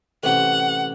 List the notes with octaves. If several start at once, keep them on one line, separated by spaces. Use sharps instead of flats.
A1 C3 F#5